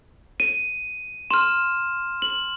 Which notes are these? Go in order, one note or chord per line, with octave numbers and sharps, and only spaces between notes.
D#7
C6 F6 E7
F#7